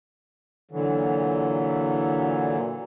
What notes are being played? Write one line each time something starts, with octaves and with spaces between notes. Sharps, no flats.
A#2 D3 E3 F#3